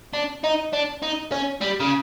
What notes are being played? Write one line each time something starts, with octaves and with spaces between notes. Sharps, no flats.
D4
D#4
D4
D#4
C#4
G3
C#3